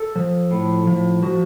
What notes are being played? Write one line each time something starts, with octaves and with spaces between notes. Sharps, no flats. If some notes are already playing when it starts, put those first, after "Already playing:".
Already playing: A4
F3
A2
F3
F3 F#4